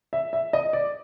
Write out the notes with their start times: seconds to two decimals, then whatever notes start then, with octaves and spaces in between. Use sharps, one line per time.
0.13 E5
0.33 E5
0.53 D#5
0.73 D5